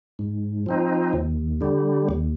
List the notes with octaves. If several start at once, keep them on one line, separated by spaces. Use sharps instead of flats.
G#2
F3 C4 D#4
D#2
D3 G3
D#2